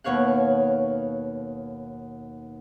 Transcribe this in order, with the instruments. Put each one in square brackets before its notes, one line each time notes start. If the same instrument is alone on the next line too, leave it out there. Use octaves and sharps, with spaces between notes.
[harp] D#2 B2 C#5 F5 F#5